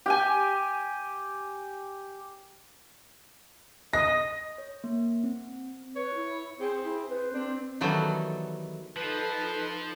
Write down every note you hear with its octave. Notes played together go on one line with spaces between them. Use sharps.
G4 G5 G#5
D#5 A#6
C#5
A#3
C4
B4 C#5
E4
C4 G#4 C5
E4 G#4
B4 C5
C4 D4
D#3 E3 F#3 G3 B3 A4
F3 D#4 A4 B4